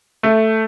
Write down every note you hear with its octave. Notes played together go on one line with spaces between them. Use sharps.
A3